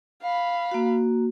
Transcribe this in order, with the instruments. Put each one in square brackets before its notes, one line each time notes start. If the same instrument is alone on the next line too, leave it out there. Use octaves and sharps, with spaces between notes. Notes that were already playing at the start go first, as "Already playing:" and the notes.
[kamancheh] F5 B5
[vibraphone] A#3 F#4